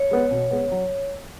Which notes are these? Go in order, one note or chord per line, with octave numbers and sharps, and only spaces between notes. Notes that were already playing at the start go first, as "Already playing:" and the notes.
Already playing: C#5
G#3 B3
B2
G#3 B3
F#3